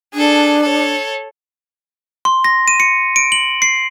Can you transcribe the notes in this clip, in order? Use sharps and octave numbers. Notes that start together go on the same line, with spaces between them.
D4 G#4 A4
A4 C#5
C6
A#6
D#7
C#7
D7
F#7
C7